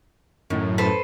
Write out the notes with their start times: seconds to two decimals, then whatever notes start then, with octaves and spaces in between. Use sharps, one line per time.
0.50 F#2 A2 D#3
0.78 A4 B4 C5